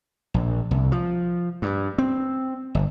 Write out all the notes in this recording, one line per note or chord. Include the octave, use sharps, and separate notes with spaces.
A#1
C2
F3
G2
C4
G1